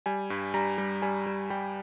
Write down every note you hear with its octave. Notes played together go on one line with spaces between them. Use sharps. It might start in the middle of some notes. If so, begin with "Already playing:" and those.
G3 G#5
G2
G3 A#5
G3
G3 G#5
G3
G3 G5